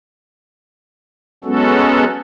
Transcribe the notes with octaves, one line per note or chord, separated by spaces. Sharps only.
F#3 G#3 B3 C#4 F#4 A4